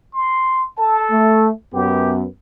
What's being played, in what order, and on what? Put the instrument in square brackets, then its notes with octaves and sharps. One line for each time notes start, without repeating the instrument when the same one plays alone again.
[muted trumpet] C6
[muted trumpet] A4 [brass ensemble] A5
[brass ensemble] A3
[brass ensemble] F#2 B3 [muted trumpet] G4